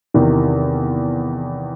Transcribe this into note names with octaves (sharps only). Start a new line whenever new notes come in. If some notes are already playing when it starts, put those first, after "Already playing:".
E2 C3 D#3